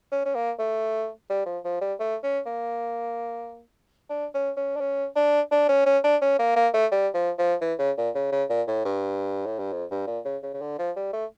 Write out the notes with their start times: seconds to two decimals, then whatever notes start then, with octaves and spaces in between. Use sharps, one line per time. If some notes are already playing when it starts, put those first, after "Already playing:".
0.12 C#4
0.26 C#4
0.35 A#3
0.59 A3
1.30 G3
1.46 F3
1.65 F3
1.81 G3
2.00 A3
2.23 C#4
2.46 A#3
4.10 D4
4.34 C#4
4.57 C#4
4.76 D4
4.81 C#4
5.16 D4
5.51 D4
5.69 C#4
5.86 C#4
6.04 D4
6.22 C#4
6.39 A#3
6.56 A#3
6.74 A3
6.92 G3
7.14 F3
7.38 F3
7.61 E3
7.79 C#3
7.97 A#2
8.15 C#3
8.32 C#3
8.50 A#2
8.68 A2
8.85 G2
9.46 A2
9.59 G2
9.73 F2
9.91 G2
10.07 A#2
10.25 C#3
10.43 C#3
10.53 C#3
10.61 D3
10.79 F3
10.96 G3
11.13 A3